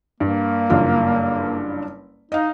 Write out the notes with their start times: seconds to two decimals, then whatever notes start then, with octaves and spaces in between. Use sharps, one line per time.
0.20 G2 A#3
0.70 F#1 G2 F4
2.32 D#4 D#5 F5